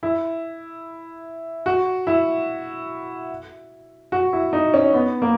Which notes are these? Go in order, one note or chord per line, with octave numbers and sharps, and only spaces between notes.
E4
F#4
E4
F#4
E4
D#4
C#4
B3
A#3